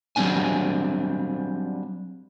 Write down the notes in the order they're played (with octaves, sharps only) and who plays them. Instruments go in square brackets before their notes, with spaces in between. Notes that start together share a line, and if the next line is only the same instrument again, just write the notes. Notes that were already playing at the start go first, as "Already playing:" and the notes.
[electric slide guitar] F#3 G3 C4 D4 G#5